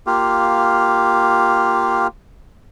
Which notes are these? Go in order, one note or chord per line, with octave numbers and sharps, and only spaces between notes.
A#3 F4 G4 F5